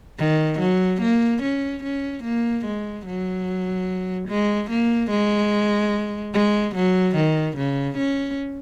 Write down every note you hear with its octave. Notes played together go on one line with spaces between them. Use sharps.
D#3
F#3
A#3
C#4
C#4
A#3
G#3
F#3
G#3
A#3
G#3
G#3
F#3
D#3
C#3
C#4